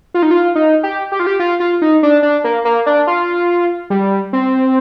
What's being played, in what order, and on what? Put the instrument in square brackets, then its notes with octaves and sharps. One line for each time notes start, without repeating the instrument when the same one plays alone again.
[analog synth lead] F4
D#4
F4
D#4
G4
G4
F4
G4
F4
F4
D#4
D4
D4
A#3
A#3
D4
F4
G3
C4